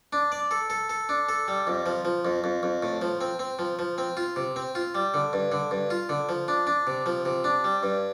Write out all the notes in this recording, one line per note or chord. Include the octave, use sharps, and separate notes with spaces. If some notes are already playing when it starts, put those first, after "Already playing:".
D4
D5
A4
A4
A4
D4
A4
G3
F2
F3
F3
F2
F2
F2
A2
F3
C4
C4
F3
F3
C4
F4
C3
C4
F4
G3
D3
G2
D3
G2
F4
D3
F3
D4
D4
C3
F3
C3
D4
G3
G2